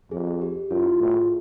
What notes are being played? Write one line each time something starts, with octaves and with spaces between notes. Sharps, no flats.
F2 G#4
G4
F#2 F4
E4
F4
A2 F#4
G#4